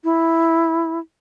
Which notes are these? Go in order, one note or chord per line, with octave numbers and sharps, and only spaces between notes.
E4